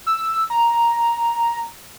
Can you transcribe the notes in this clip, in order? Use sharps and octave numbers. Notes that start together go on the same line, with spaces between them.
E6
A#5